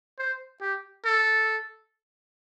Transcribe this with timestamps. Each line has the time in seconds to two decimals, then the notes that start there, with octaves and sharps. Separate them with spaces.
0.19 C5
0.61 G4
1.05 A4